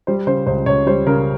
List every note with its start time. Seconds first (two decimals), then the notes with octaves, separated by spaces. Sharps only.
0.07 G3 C5
0.27 C#3 C5
0.47 C#2 C5
0.66 C#2 C#5
0.86 G3 C5
1.07 C#3 A#4